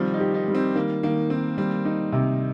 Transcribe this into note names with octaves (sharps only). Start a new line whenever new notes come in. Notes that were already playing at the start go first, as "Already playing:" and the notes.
Already playing: C3 D#3 F3 G3 C4
D#4
G4
D#4
G3
C4
D#3 A#3
D#3 A#3
D#3 C4
G3 C4
D#4
C3